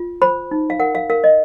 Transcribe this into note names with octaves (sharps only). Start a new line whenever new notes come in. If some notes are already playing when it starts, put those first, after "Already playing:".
Already playing: F4
C5 B5
D#4
F5
A#4 F#5
F5
A#4 F5
D#5